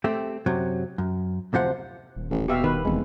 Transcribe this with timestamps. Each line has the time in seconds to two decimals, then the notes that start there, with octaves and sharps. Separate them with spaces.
0.04 A3 C4 G4
0.46 F#2 C3 F#3
0.98 F#2
1.53 D2 C3 F3 F#5
2.16 D#1
2.30 A1
2.48 B2 G4 E5 F5
2.64 D#3 B4
2.85 F1 E2 G#3